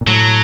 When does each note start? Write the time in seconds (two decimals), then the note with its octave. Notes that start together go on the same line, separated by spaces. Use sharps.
0.01 A#2
0.07 A2 F#3